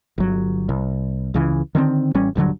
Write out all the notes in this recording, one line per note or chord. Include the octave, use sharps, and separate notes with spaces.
G1 F#3
C2
C#2 C#3 E3
D3 D#3 B3 C4
A1 G3 C#4
D#1 G2 D3 F#3